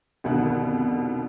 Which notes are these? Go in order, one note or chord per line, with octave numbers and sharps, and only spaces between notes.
C2 F2 B2 D3 D#3 F#5